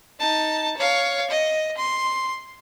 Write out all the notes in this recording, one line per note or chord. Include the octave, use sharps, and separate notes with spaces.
D#4 A5
C#5 F5
D#5
C6